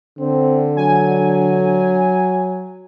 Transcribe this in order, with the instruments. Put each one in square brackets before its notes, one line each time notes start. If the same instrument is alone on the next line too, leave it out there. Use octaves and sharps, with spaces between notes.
[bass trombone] D3 [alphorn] C4
[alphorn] F#3 [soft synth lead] G#5